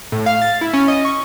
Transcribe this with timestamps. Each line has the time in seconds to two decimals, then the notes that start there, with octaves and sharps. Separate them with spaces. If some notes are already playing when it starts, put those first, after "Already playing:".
0.12 A2
0.26 F5
0.42 A6
0.61 E4
0.74 C#4
0.88 D#5
1.05 C#6